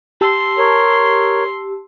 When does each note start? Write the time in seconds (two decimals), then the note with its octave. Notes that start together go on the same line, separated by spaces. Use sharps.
0.21 G4 A5 C6 E6
0.58 A#4 C#5